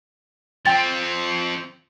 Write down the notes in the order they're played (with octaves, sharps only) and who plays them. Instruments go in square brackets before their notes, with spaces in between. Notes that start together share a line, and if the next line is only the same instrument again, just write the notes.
[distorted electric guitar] F3 C4 [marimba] G5 A6